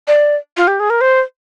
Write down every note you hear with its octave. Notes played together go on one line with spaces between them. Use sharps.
D5
F4
G4
G#4
A#4
C5